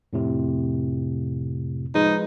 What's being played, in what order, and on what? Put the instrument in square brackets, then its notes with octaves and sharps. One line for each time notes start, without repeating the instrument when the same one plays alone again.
[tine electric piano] F2 A2 C3
[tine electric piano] F3 G#3 B4 [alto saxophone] D#4